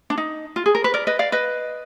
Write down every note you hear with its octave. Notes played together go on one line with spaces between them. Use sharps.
D4
D#4
F4
G#4
A#4
B4
A#4 D5
B4 D#5
D5 F5
B4 D#5